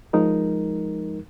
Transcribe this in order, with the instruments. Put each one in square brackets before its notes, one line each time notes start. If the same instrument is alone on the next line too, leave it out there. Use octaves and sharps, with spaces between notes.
[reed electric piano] F3 G#3 D#4 A#4